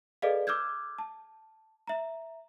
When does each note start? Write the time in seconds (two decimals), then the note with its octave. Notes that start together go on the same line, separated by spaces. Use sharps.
0.22 G#4 A4 B4 D5 D#5 F5
0.47 D6 E6 F6 G6 G#6
0.98 A5
1.87 E5 A#5